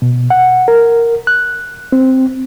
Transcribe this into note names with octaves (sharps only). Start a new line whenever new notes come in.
B2
F#5
A#4
F#6
C4